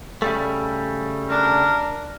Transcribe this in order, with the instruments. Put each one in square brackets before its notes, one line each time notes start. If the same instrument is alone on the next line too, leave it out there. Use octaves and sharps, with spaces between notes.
[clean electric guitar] C#3 G3 A3
[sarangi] D4 [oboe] A#4